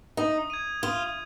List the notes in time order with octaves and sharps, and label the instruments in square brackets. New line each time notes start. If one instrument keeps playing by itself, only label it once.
[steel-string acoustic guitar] D#4 [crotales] D#6
[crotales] G#6 D#7
[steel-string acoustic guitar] F4 [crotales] D#6